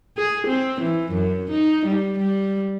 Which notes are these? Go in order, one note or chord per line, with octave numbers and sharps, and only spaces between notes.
G#4
C4
E3
F#2
D#4
G3
G3